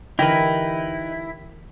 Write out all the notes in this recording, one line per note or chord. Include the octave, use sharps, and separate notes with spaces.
D3 E3 D#4 E4 G4 A#4 B4